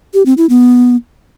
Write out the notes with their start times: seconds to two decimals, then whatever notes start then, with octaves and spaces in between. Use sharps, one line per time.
0.14 G4
0.26 C4
0.38 E4
0.49 B3